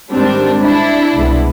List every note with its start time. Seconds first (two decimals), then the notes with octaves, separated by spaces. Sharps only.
0.11 G#2 D#3 G3 C4 D4
0.62 D4 E4
1.15 C2 B2 G#3 B3